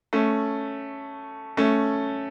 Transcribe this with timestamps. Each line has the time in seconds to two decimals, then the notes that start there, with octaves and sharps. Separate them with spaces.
0.13 A3 C#4
1.57 A3 C#4